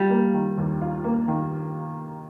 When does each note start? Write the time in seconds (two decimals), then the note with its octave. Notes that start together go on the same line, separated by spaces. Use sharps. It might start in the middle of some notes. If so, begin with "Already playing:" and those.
Already playing: G3 F4
0.10 A#3
0.34 D#3
0.58 D#2
0.82 F4
1.04 A#3
1.28 D#3